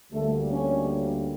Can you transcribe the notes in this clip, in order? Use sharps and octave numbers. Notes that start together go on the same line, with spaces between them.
D2 D3 G3 A3 A#3 A4
C#4 C#5